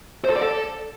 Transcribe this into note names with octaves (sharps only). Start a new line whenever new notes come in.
C5
A4
D5
A4